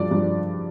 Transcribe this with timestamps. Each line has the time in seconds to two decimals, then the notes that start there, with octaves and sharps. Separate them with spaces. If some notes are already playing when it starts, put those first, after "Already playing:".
Already playing: G2 F3 D5
0.11 G2 F3